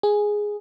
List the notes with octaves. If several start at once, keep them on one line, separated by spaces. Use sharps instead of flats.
G#4